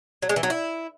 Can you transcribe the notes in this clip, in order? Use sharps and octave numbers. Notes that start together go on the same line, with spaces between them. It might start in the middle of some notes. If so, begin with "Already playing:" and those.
F#3
G#3
E3
F#3
E4